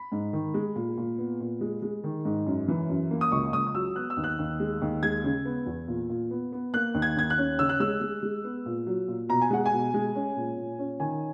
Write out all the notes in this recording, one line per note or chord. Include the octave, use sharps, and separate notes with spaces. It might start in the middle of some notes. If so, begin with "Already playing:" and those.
Already playing: B5
G#2
D#3
G#3
A#2
A#2
B3
A#2
G#3
G#3
D#3
G#2
F#2
E3
F#2
A#3
D#6
C#2 C#6
C#2 D#6
D#6
F#3 E6
B3 F#6
E6
D#2
F#6
D#2
G#3
D#2
G#3 G#6
C#3
B3
E2
A#2
A#2
B3
B3
A#3 F#6
D#2
G#6
D#2 G#6
F#6
C#4
C#3 E6
F#6
G#3 E6
G#3
G#3
B3
A#2
F#3
A#2
B2 A#5
G#5
G#3 F#5
G#5
B2
G#3
C#4
A#2
A#2
C#4
D#3 G#5